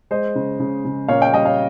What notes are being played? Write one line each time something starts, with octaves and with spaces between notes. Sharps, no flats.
G#3 C5 D#5
C#3
C#3
C#3
A#2 C#5 F5
D#5 G5
G3 D#5 G5
C#5 F5